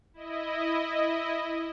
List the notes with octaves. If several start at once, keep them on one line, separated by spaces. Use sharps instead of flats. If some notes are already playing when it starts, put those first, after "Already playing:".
E4 D#5